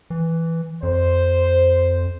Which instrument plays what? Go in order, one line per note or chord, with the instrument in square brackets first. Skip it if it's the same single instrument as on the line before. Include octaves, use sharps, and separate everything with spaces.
[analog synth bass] E3
[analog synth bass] F2 [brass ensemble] C5